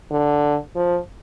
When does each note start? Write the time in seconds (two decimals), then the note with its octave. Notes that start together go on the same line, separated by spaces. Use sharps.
0.11 D3
0.75 F3